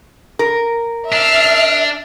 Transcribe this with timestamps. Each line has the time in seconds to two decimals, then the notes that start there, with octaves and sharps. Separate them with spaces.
0.39 A#4
1.12 D4 E5 F6 C7